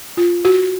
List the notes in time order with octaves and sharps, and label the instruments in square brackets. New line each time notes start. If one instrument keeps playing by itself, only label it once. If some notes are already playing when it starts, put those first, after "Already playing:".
[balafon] F4
F#4